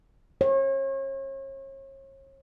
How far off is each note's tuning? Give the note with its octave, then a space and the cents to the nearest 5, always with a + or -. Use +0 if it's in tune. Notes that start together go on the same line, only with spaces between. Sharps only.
C#5 -40